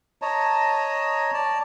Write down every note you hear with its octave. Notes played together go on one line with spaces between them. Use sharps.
C#5 D#5 A5 A#5
D5 A5